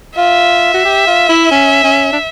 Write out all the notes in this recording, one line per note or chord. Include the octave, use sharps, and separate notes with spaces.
F4 E5
F#4
G4
F4
E4
C#4
C#4
D4